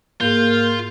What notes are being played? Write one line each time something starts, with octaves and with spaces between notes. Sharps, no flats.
G#2 A#3 F4 G#4 G6